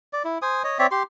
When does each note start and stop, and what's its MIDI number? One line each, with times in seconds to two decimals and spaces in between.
0.13 0.23 74
0.24 0.38 64
0.42 0.63 72
0.42 0.63 80
0.42 0.63 87
0.64 0.78 73
0.64 0.78 75
0.79 0.87 60
0.79 0.87 73
0.79 0.87 74
0.79 0.87 76
0.91 1.03 67
0.91 1.03 84